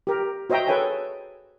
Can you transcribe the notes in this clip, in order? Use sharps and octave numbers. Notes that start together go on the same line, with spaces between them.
G4 A#4
F#4 C5 D#5 E5 G5 A#5
G#4 A4 B4 C#5 G5 G#5